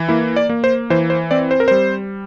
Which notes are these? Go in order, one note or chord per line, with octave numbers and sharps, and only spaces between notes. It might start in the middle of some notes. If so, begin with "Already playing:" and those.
Already playing: E3
A#3 E4
D5
A#3
C5
E3 C5
C5
C4 D5
C5
A#4
G3 C5